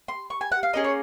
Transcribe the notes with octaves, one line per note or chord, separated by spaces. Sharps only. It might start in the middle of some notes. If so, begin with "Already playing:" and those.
C6
C#6
G#5
F#5
F5
A#3 C#4 G#4 D#5
C#5